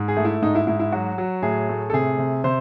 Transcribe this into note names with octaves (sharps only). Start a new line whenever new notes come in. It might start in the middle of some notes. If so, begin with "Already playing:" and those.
Already playing: G#2
G#4
A3
E4
G#2 D#4
E4
G#2 E4
E4
F#3 F#4
F#3
A2 G#4
A3
A4
C3 G#4
C3
C3 C5